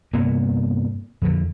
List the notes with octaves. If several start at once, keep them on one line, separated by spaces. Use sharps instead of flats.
G2 C3 A#3 B3
F2 D3